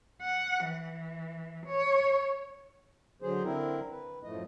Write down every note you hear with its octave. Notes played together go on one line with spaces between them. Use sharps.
F#5
E3
C#5
D3 F#3 G#4 C5
D3 C4 E4 A#4
B4
F#2 A2 F3 A3 D#5